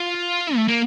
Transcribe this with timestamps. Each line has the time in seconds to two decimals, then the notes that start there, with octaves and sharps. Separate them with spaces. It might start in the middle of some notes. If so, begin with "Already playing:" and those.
Already playing: F4
0.55 A3
0.68 A#3